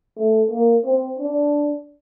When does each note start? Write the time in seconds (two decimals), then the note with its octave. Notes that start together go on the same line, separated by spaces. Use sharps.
0.18 A3
0.51 A#3
0.85 C4
1.19 D4